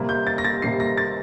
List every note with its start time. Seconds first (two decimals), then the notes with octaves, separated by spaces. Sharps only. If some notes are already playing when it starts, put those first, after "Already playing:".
Already playing: C3 G3 A#3
0.09 G6
0.27 A6
0.38 A#6
0.44 A6
0.62 C3 G3 A#3 C7
0.80 A#6
0.97 A6